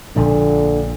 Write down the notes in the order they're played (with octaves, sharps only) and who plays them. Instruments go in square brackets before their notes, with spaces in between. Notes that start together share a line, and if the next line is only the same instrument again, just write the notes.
[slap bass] A#1 A#2 F3 [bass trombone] D3